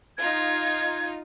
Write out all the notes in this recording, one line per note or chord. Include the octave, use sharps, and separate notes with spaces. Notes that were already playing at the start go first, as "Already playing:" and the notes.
D#4 F4 G#6